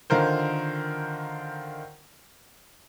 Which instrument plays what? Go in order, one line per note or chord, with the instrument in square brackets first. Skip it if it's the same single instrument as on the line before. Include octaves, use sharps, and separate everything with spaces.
[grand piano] D3 D#3 F4 A#4 C5